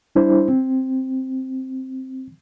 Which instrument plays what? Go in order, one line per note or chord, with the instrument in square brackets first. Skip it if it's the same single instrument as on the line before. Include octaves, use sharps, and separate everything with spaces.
[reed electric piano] G3 D4 E4 C5
C4